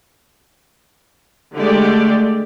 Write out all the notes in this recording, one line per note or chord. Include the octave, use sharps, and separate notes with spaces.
D3 G#3 A3 G4 D5